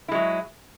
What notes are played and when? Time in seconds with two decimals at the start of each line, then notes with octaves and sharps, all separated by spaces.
0.08 E4
0.12 G#3
0.15 F#3